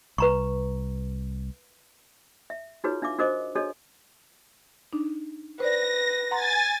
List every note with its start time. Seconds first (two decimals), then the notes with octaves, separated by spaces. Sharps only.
0.18 C2 B4 A#5 C#6
2.50 E5
2.84 D#4 F4 F#4 G#4 B4 C#5
3.02 D4 E5 F5 D6
3.18 D4 F#4 A#4 C5 D#5 D6
3.55 D4 F#4 G#4 A4 C#5 D#5
4.93 D4 D#4
5.60 B4 C5 D5 A#6
6.31 F#5 G#5 A#5 C6 A6